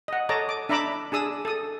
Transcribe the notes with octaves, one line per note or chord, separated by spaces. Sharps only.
D#5 F#5
A4 C#5 D#5 A5 A#5 D6
D6
D4 E5 A#5 B5 D6 E6
D4 G#4 D#6 E6
A4 D#6